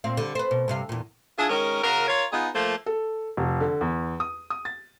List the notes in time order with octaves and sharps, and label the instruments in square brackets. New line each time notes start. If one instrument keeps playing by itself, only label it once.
[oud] A#2 C4 F5
D3 G3
B4 C5
B2
G2 C3 F5
E2 A#2
[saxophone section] D4 E4 F4 G#4
D#3 G#3 C#4 A#4
C#3 F#4 A#4
F4 A#4 C#5
B3 D#4 F4 G#4
F3 A3 A#3 C5
[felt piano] A4
F1
D3
E2
D#6
D#6
A6